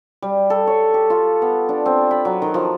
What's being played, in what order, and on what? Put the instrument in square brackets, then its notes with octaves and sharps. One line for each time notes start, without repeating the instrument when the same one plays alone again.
[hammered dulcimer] G3
A4
C#5
G4
F4
B3
D4
C4
B5
F#3
D#3
F3